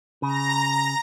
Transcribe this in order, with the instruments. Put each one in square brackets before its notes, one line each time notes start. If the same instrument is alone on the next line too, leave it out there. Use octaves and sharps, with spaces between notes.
[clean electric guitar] C#3 [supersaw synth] A#5 A#6